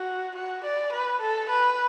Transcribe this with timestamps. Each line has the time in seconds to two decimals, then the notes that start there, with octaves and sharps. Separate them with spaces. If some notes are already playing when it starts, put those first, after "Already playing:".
Already playing: F#4
0.36 F#4
0.65 D5
0.93 B4
1.22 A4
1.50 B4